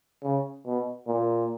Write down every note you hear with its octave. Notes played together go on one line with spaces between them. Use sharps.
C#3
B2
A#2